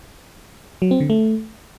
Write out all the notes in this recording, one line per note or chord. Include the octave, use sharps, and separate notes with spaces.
F#3
C4
D3
A3